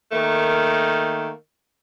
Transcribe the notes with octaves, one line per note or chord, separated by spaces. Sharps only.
D#3 A3 A#3